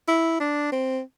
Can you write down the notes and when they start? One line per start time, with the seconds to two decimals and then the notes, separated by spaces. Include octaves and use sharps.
0.08 E4
0.40 D4
0.72 C4